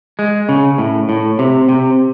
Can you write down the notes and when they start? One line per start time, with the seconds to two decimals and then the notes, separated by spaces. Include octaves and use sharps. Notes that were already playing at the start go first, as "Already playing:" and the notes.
0.19 G#3
0.49 C#3
0.78 A2
1.09 A2
1.39 C3
1.69 C3